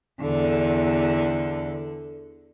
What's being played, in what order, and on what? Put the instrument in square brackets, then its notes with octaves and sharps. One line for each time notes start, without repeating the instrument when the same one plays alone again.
[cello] E2 D3